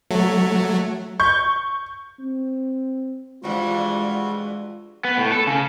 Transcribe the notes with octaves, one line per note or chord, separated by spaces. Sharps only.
F#3 A3
C#6 G6
C4
G2 E3 F3 G3 G#3 F4 F#4
B3
A2
A4
C#3